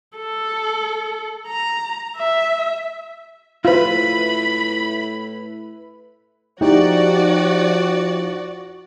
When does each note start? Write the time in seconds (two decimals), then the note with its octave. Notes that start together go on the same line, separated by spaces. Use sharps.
0.17 A4
1.48 A#5
2.17 E5
3.65 A2 E4 F4 B4 B5
6.61 F3 D#4 E4 F#4 G4 D5